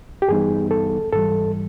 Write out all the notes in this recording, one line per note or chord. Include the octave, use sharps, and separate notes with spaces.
G4
G2 E3 G3 B3 D#4 G#4
A4
G#2 E3 G3 A4